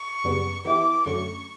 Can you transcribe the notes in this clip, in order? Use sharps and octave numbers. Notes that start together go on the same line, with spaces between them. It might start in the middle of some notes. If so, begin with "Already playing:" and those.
Already playing: C#6
F#2 C#3 G3 B3
E3 B3 E4 G4 D6
F#2 D3 F#3 A3 C#4 C#6